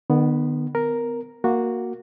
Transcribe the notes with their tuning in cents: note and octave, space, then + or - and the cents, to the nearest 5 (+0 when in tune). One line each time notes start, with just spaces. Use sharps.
D#3 -45 B3 +0
B3 +40 A#4 +0
A#3 +0 F#4 -10